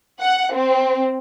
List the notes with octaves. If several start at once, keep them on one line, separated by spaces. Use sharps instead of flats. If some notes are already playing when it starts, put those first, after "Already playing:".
F#5
C4